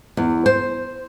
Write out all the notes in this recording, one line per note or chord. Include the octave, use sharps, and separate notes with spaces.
E2
C5